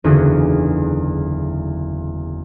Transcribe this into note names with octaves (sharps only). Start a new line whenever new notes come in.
F#1 E2 D3 D#4 F#4 G#4